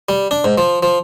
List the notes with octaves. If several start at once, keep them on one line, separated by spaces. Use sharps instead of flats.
G3
D4
G#2
F3
F3